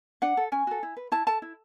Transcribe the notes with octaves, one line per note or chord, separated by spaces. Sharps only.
D4 F#5
A4
C#4 G#5
F#4 A4
E4
B4
E4 A5
A4 A5
E4